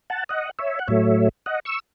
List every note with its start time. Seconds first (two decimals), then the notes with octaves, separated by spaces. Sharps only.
0.10 F#5 A5
0.29 D#5 F#5
0.59 C#5 E5
0.79 F#5
0.87 A2 F#3 A3 C#5 E5
1.46 D#5 F#5
1.65 C#6 E6